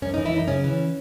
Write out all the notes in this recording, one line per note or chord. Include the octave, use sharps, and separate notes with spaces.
F#2 C#4
E3 D#4
E4
F#2 D#4
C#3 C#4
E3